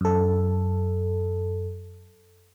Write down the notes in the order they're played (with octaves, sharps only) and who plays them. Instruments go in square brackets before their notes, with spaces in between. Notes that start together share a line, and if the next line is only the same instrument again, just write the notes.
[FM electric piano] F#2 A4